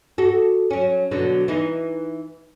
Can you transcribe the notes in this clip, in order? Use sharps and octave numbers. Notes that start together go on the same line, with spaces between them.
F#4 A4
F#3 C#4
B2 D3 F#3
E3 D#4 E4